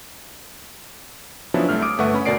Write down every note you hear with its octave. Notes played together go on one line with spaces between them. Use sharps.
F3 F#3 B3 C#4 D4 E4
C2 A3 F6
D6 D#6 D7
G1 A3 B4 E5 F#5 C#6
C#4 B5
D2 B2 A#4 D5 C7 D7